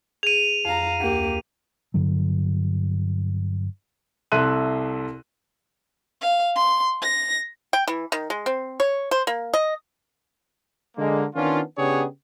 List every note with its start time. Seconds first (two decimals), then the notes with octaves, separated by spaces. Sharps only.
0.23 G#4 D#7 F7
0.65 F2 F5 A#5
1.00 D2 A#3 G4
1.94 G2 D3 F#3
4.32 C2 A4 E5 C6 F#6 D#7
6.21 F5
6.55 C6
7.02 A#6
7.73 G5
7.88 E3
8.12 D#3
8.30 G#3
8.46 C4
8.80 C#5
9.11 C5
9.27 A#3
9.54 D#5
10.97 D3 G#3 A#3
11.35 D#3 B3 C#4 D4 F4
11.77 C#3 B3 D4 G4 G#4 C#5